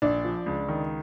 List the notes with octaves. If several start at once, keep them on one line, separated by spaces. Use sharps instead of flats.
A#1 D4
F3
C#2
D#3